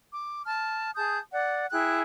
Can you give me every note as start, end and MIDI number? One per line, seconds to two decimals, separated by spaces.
0.13 0.42 86
0.45 0.91 81
0.45 0.91 89
0.96 1.18 68
0.96 1.18 81
0.96 1.18 87
0.96 1.18 91
1.32 1.65 74
1.32 1.65 78
1.71 2.01 64
1.71 2.01 68
1.71 2.01 79
1.71 2.01 90